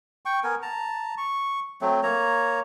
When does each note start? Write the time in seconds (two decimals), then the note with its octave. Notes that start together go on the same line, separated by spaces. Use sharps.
0.26 G5 C#6
0.44 B3 A#4 G#5
0.62 A5 A#5
1.18 C#6
1.81 F#3 A3 C4
2.03 A#3 C#5 A#5